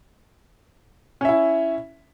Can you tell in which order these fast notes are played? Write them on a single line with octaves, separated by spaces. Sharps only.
C#4 E5 E4